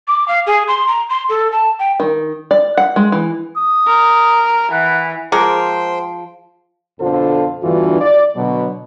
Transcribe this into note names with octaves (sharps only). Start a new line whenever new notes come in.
D6
F5
G#4
C6
A#5
C6
A4
A5
G5
D#3
D5
F#5
G#3
E3
D#6
A#4
E3 F#5
F3 G#3 G#4 A#4 C5 G5
F2 B2 D3 F4 A4 C5
E2 G2 D3 E3 F4 F#4
D5
B2 D3 F#3